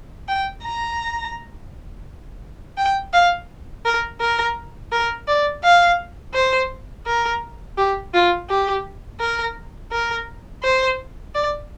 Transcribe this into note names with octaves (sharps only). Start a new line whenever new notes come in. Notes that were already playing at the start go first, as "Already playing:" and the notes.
G5
A#5
G5
F5
A#4
A#4
A#4
D5
F5
C5
A#4
G4
F4
G4
A#4
A#4
C5
D5